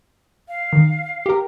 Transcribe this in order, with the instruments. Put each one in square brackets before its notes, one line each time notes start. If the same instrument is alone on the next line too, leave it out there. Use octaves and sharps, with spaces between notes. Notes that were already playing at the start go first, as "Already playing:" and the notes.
[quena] F5
[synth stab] D#3
G4 A#4